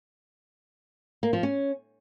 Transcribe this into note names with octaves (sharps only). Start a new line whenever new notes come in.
A#3
F3
C#4